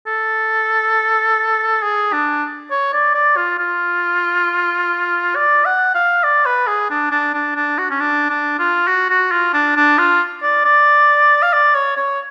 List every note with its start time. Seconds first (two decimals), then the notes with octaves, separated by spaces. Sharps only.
0.06 A4
1.83 G#4
2.13 D4
2.71 C#5
2.93 D5
3.14 D5
3.36 F4
3.59 F4
5.36 D5
5.65 F#5
5.95 F5
6.24 D5
6.46 B4
6.67 G#4
6.90 D4
7.11 D4
7.34 D4
7.56 D4
7.78 F#4
7.91 C#4
8.00 D4
8.30 D4
8.59 F4
8.88 F#4
9.10 F#4
9.31 F4
9.54 D4
9.76 D4
9.98 F4
10.43 D5
10.65 D5
11.42 F5
11.53 D5
11.75 C#5
11.97 C#5